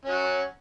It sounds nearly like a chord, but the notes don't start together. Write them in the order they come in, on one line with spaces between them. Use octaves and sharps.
C#4 F#3 F#4